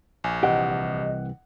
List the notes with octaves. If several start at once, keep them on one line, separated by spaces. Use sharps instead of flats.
A#1 G#5
C2 E3 G4 D#5 F#5